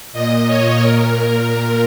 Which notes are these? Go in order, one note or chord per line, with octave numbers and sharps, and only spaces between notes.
A#2 D#5
C#5
A#2 A#4
A#4